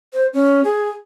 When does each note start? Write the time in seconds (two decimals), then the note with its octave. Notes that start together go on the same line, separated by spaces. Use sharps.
0.13 C5
0.33 C#4
0.64 G#4